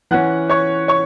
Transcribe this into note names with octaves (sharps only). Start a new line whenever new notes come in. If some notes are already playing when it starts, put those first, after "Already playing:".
E3 C#4 F#5 F#6
C#5 C#6
C#5 C#6